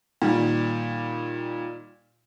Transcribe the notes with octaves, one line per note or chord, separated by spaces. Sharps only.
A#2 D#3 G3